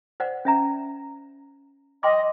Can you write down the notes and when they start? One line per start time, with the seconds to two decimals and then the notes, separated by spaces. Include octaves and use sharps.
0.20 C5 D5 F#5
0.45 C#4 E5 A#5
2.03 D#5 G5 C6 D6